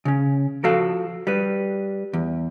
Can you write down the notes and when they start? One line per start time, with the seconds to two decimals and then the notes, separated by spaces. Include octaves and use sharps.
0.05 C#3 C#4
0.64 F3 F#4 A4 F5
1.27 G3 B4
2.13 E2